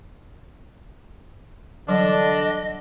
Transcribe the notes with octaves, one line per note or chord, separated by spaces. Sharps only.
D3 E3 F#3 G3 D4 D#5